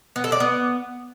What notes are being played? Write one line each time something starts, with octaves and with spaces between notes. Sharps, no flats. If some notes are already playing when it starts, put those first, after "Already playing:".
B3
A4
D5
B3